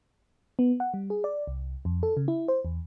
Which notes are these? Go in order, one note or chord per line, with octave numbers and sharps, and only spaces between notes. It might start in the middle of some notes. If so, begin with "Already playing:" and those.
B3
F#5
G3
G#4
D5
C2
F2
A4
C#3
E4
C5
E2